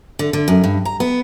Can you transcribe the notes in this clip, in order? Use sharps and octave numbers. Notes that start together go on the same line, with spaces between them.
D3
D3
F#2
G2
A#5
B3